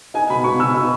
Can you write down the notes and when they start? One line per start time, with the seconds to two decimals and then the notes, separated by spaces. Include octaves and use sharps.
0.14 D#4 G#5
0.29 B2 B5
0.44 B2 C#6
0.59 B2 E6
0.74 D#4